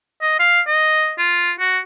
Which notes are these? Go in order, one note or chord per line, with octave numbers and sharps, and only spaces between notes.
D#5
F5
D#5
F4
F#4